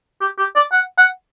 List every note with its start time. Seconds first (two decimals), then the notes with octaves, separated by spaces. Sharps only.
0.21 G4
0.38 G4
0.56 D5
0.72 F#5
0.98 F#5